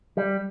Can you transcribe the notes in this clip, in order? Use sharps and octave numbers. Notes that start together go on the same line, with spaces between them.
G3